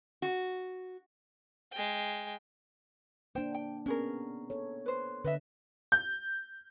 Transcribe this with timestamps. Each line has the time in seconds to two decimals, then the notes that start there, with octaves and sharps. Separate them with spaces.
0.22 F#4
1.72 G#3 G5
3.35 A#3 D4 C5 G5
3.54 G5
3.86 B3 C#4 G#4 A#4
4.50 A4 C#5
4.86 B4 C5
5.24 D3 B4 D#5 E5
5.92 G6